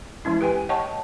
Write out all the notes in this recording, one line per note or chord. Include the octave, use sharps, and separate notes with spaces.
E3 G#3 C#4 E4
G4 B4 G5 G#5
C#5 D#5 F#5 G5 A5 C#6